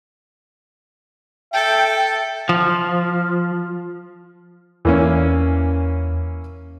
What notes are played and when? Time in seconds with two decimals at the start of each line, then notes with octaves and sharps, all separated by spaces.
1.54 A4 E5 G5
2.49 F3
4.85 E2 E3 A#3 C#4